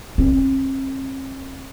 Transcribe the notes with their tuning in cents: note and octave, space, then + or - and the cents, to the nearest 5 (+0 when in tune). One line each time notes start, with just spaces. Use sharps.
C4 +45